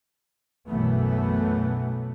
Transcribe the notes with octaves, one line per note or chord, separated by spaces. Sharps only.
B1 F#2 B2 E3 A3 B3